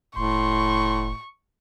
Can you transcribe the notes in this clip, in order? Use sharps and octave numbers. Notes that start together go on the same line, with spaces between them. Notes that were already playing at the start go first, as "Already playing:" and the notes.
F1 A2 C6 C#6